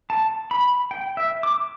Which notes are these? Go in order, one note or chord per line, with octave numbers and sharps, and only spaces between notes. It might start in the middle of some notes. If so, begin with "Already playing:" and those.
A5
B5
G5
E5
D6